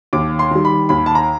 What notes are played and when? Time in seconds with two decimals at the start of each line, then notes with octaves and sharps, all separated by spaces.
0.13 D#2 D6
0.39 C6
0.51 D#3 G3
0.65 B5
0.89 D#2 B5
1.06 A5
1.15 A#5